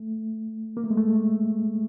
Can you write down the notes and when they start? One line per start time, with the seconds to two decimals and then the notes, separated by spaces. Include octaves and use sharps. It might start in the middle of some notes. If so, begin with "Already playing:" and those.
Already playing: A3
0.77 A#3
0.83 A3
0.90 G#3
0.97 A3